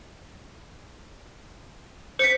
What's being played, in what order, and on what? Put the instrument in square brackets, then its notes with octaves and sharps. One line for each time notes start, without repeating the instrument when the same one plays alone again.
[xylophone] C5 B6 [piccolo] C#7